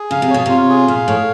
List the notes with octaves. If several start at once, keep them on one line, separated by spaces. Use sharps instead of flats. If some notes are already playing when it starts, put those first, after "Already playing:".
Already playing: G#4
C#3 F5
C3
B2 C#5
C3 F4
G#4
A#2 F5
A2 C#5